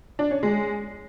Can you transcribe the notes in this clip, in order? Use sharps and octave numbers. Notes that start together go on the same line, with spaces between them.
D4
C#4
G#3